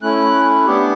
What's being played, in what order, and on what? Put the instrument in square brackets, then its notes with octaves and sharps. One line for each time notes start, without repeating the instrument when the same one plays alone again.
[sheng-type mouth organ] A3 C#4 E4 F#6
B3 D4 G4